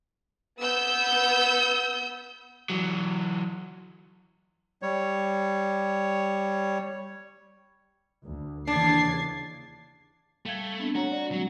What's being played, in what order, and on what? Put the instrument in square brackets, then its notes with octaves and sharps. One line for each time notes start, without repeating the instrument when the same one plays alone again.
[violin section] B3 E6 G6
[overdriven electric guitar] E3 F#3
[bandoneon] G3 C#5
[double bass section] D2
[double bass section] D#2 C#3 E3 [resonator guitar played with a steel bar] D4 [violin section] G#6 A6 C7
[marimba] G3 F5 G#6 [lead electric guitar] A3
[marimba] B3 C4 D4
[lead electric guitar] F#4 [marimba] C#5 A#5
[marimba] D5
[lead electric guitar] F#3 [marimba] G#3 C4 F#4